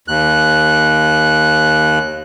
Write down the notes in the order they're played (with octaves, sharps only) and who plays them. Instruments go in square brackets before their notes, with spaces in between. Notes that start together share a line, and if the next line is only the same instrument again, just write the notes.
[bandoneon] D#2 F#6